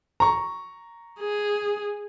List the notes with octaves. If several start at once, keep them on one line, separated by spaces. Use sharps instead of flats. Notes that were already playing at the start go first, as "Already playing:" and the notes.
A#5 C#6
G#4